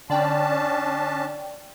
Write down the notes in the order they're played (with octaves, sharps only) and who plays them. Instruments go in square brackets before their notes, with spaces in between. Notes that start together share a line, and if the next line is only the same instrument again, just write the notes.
[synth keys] D3 D5 G5 [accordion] C#4 D4 A5